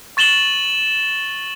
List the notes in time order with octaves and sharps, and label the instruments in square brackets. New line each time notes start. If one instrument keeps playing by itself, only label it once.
[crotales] C#6 A6 E7 F#7 G7